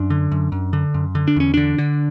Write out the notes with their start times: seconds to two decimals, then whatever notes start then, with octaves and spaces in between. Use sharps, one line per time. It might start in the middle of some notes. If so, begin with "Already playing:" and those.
Already playing: F#2 D4
0.10 D3
0.32 F#2
0.52 F#2
0.73 D3
0.94 F#2
1.15 D3
1.28 D4
1.36 E2 C#4
1.54 D3 D4
1.78 D3